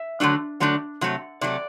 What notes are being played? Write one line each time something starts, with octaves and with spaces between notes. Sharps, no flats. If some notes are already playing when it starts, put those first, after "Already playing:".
Already playing: E5
D3 F#3 A3 D4
D3 F#3 A3 D4
C3 F#3 A3
C3 F#3 A3 D5